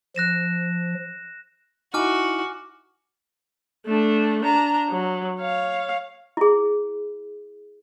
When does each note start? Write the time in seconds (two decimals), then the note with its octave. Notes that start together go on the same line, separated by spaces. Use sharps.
0.16 F3 F#6 A#6 E7
1.94 D#4 E4 F#4 G#5 D6 F6
3.85 A3 D4
4.42 D4 A#5
4.90 F#3
5.39 C#5 F5
6.37 E4 G#4